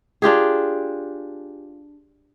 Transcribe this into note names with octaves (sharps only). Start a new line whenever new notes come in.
D4 F4 G4 G#4